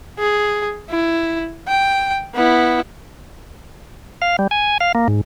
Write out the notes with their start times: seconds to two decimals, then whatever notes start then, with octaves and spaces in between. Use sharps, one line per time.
0.19 G#4
0.90 E4
1.68 G5
2.34 B3 E4
4.22 F5
4.39 G3
4.51 G#5
4.80 F5
4.95 A#3
5.08 G#2